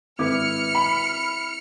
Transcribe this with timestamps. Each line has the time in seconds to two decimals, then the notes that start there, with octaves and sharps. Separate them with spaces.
0.19 G#1 E4 B4 D6 F6 C#7
0.75 B5